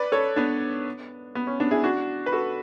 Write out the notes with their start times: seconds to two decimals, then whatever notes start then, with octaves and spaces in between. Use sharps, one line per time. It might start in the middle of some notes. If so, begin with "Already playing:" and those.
Already playing: B4 D5
0.12 A4 C#5
0.36 B3 D4
1.35 B3
1.47 C#4
1.60 B3 D4
1.71 E4 G#4
1.83 D4 F#4
2.26 B4
2.32 F#4 A4